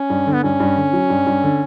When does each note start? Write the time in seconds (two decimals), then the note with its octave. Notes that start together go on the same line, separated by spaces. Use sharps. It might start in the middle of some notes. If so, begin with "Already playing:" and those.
Already playing: C#4
0.10 G2
0.27 D3
0.33 B3
0.43 G2 C#4
0.60 G2
0.77 D3
0.93 F#3
1.10 G2
1.27 G2
1.43 D3